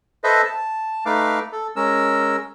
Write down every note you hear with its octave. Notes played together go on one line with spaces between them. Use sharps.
A4 B4 C5 D#5 E5
A5
A3 D#4 B4 F5 D6
A4
G#3 C#4 A#4 E6